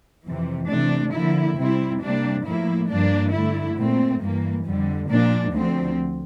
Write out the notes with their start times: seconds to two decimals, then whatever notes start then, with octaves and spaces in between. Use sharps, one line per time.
0.24 F2 C3 E3
0.68 C3 E3 A3 D4
1.13 D3 F3 A#3 E4
1.56 C3 G3 C4 E4
2.01 C3 G3 A#3 D4
2.45 A2 F3 A#3 E4
2.89 G2 F3 A#3 D4
3.32 G2 D3 A3 E4
3.76 A#2 A3 C4
4.20 G2 E3 A#3
4.64 F2 D3 G3
5.08 A#2 F3 A#3 D4
5.53 D2 D3 F3 C4